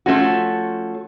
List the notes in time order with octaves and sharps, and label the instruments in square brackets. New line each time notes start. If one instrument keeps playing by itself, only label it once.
[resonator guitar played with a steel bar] F3 A3 C#4 F#4